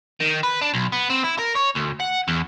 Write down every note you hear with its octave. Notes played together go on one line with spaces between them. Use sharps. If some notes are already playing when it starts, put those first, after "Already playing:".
D#3
B4
D4
B1
B3
C4
E4
A#4
C#5
D2
F#5
E2